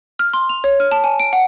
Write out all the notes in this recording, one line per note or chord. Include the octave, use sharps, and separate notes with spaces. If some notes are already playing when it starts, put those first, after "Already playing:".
F6
C6
F7
C#5
F6
A5
G#5
D7
F#5